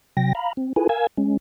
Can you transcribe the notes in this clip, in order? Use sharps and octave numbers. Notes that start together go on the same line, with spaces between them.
C3 F#3 G5 A#6
F5 A#5 B5
C4
E4 F4 G#4 A4 B4 G#5
A#4 F5 G#5 E6 G#6
G#3 C#4